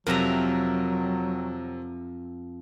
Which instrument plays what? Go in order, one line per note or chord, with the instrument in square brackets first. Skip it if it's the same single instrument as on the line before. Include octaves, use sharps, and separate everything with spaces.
[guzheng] F2 E5 A#5 [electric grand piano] C3 C4 A#4 [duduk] F#3